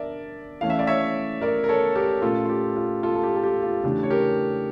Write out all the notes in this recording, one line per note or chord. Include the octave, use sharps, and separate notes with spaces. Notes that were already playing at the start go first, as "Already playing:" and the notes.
Already playing: D4 A#4 D5 E5
E3 A3 C#4 F5
E5
D5
C#5 E5
A#4 D5
A#4
A4 C#5
G4 A#4
A#2 A3 C#4 F4 A4
F4
G4
F4
F4 A4
A4
G4
A4
G4
F4
C#3 E3 A3 D4 G4
C#5
G4 A#4